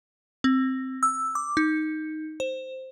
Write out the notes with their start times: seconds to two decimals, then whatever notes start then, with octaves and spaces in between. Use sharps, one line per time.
0.44 C4
1.03 E6
1.35 D6
1.57 D#4
2.40 C5